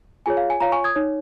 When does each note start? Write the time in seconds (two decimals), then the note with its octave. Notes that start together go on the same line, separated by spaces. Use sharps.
0.26 F4 G#4 C#5 G#5
0.37 F5
0.50 G#5
0.60 F4 C#5 F5 A#5
0.72 G#5 C#6
0.84 D#6 G#6
0.95 D#4 C#5